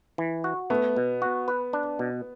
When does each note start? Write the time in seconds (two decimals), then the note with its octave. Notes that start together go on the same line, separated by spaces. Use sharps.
0.18 E3
0.44 F#4
0.70 A3 B3
0.96 B2
1.22 F#4
1.48 B4
1.73 D4
1.99 B2